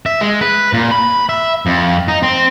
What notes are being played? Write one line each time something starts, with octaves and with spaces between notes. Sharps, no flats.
E5
G#3
B4
A#2
B5
E5
F2
D#4
C4